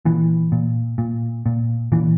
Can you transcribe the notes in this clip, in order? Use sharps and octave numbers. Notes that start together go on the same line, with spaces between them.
A#2 E3
A#2
A#2
A#2
A#2 E3